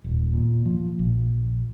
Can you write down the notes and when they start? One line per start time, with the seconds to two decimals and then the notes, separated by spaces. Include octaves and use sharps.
0.04 D#1
0.33 A#2
0.65 F3
0.99 A#1